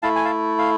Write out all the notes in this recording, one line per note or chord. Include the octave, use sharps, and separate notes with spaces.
A3 E4 F5 A5
G#5
F5 A5
F5